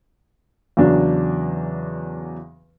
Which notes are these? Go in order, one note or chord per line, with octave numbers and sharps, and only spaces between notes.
E2 C#3 F#3 D4